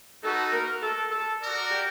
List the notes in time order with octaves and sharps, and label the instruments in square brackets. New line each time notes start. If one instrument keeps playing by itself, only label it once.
[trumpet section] D#4 F#4 B4 [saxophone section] A4
[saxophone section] A#4
A4
A4
[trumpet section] F#4 A#4 D5
[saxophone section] G4